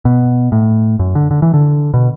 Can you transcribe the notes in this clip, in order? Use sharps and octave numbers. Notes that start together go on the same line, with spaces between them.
B2
A2
F#2
D3
D3
E3
D3
B2